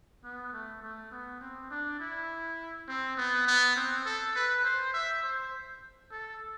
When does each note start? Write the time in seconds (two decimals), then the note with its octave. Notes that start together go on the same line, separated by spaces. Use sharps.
0.24 B3
0.53 A3
0.82 A3
1.11 B3
1.41 C4
1.70 D4
2.00 E4
2.88 C4
3.17 B3
3.47 B3
3.76 C4
4.05 A4
4.35 B4
4.65 C5
4.94 E5
5.23 C5
6.11 A4